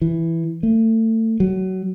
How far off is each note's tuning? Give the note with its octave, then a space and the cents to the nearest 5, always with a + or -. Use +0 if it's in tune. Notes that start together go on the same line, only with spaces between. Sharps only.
E3 +5
A3 +30
F#3 +20